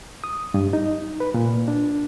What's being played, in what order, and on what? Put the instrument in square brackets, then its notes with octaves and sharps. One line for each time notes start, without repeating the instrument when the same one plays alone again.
[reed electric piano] D#6
G2
D#4
B4
A#2
D4